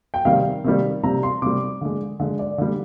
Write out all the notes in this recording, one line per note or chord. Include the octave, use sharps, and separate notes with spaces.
G5
C3 D#3 G3 F5
C3 D#3 G3
C3 G3 A#5
C6
C3 G3 D6
D3 G#3
D3 G#3
D5
D3 G3